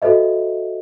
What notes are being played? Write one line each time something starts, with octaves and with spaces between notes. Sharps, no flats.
F#4 A4 C5 D#5 E5